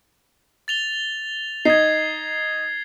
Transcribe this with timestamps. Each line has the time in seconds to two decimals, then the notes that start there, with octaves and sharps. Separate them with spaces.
0.68 A6 F7 G7
1.65 D#4 G#6 C7